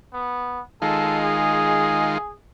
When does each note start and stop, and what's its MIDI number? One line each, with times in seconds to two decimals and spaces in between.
0.13 0.60 59
0.82 2.18 51
0.82 2.18 56
0.82 2.18 65
0.82 1.18 69
1.23 2.32 68